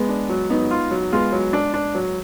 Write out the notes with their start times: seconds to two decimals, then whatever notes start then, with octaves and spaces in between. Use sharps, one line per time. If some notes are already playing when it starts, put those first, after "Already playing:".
Already playing: G#3 B3
0.09 D4
0.29 F#3
0.50 F#3 B3 D#4
0.71 F4
0.91 F#3
1.12 G#3 B3 F4
1.32 F#3
1.53 D4
1.74 D4
1.95 F#3